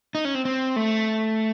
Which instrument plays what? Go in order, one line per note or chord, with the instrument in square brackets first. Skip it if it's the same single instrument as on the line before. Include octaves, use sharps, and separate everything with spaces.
[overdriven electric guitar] D#4
C#4
C4
C4
A3